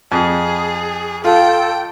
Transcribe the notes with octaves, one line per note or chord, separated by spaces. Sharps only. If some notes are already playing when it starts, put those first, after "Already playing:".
F2 G#4
F4 A4 G5